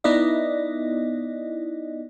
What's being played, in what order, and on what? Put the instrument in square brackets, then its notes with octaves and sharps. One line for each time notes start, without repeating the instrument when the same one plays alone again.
[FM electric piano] B3 D#4 E4 D5 D#5